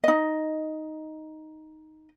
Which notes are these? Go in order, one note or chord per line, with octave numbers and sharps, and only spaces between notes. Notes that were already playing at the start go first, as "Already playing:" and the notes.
D#4 D#5